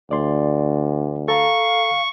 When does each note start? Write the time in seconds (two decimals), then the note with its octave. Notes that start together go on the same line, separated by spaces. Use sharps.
0.11 D2 D5 C6
1.28 A4 F5 A#5 C#6